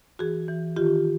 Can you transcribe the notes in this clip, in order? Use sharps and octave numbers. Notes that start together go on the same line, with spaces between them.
E3 F#4 G#4
E3
D#3 F4 G4